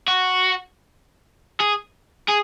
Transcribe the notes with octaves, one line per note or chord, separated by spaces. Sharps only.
F#4
G#4
G#4